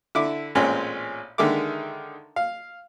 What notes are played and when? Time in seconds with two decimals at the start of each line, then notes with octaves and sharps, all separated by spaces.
0.15 D3 E4 D6
0.55 A1 A#2 G#3 C4 C#4
1.38 D3 D#3 G#3 E5 D6
2.36 F5